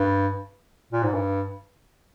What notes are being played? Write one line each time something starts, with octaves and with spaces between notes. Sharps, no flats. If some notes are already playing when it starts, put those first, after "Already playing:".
Already playing: G2
A#2
G#2
G2